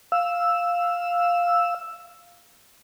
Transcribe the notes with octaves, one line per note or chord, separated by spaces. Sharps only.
F5 E6